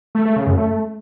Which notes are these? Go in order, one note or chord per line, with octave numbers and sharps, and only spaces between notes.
A3
A3
C#3
F#2
A3